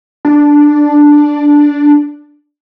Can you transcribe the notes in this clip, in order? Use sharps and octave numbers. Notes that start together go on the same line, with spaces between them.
D4